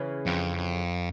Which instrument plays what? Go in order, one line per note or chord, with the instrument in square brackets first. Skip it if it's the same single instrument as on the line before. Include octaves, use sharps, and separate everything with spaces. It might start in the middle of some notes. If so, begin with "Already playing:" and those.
Already playing: [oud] C#3 E3
[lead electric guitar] F2